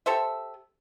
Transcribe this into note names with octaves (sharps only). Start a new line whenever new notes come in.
G4 A4 C5 E5